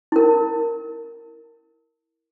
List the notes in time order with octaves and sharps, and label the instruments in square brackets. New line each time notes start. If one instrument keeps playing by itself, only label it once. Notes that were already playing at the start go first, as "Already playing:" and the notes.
[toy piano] E4 A#4